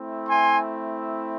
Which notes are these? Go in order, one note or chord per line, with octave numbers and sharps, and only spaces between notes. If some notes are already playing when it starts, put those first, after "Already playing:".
Already playing: A3 C4 E4
G#5 C6